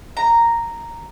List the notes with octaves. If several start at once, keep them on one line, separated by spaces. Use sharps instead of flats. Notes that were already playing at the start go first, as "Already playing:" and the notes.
A#5